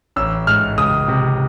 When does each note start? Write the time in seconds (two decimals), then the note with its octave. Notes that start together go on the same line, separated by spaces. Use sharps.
0.16 A1 E6
0.47 G#2 F6
0.78 C#2 D#6
1.08 C3